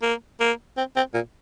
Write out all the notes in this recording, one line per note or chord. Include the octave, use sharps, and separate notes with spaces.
A#3
A#3
C4
C4
A#2